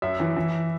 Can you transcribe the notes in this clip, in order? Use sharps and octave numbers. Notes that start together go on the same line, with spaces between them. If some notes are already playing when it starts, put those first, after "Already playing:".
F#2 E5
E3
E3